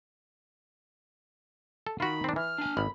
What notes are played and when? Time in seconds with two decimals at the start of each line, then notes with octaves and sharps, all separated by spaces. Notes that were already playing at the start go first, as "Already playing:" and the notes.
1.87 A4
2.00 D#3 F4 F#4 B5
2.24 C4 D4
2.36 E3 F6
2.58 D4 G#5
2.77 G#1 B5